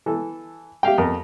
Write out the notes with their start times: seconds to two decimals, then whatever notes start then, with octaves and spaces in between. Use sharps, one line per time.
0.06 E3 A4
0.83 G4 E5 F5 G5
0.98 F2 A#4